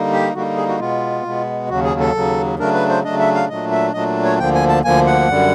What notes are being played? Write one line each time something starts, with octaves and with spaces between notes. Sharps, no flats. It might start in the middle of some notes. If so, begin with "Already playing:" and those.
Already playing: D3 G3 A#3 D#4
G4
D3 G3 A#3 D#4 F#4
G#4
F#4
B2 G#3 B3 F4
B2 G#3 B3
D#2 C#3 F#3 F#4
G#4
A4
D#2 C#3 F#3
C#3 F#3 A3 D4 A#4
B4
C5
C#3 F#3 A3 D4 D#5
E5
F5
A#2 F#3 A3 D4 D#5
E5
A#2 F#3 A3 D4 D#5
C#5
D2 D3 F3 A#3 G5
G#5
A5
D2 D3 F3 A#3 G#5
F#5
F#2 D3 G3